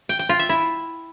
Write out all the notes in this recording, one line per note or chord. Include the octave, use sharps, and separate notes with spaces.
G5
G5
F4
E5
E4